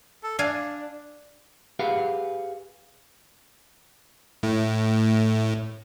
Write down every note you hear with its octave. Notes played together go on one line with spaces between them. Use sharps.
A4
D4 D5 F5 G#5
G4 G#4 B4 F5 F#5
A2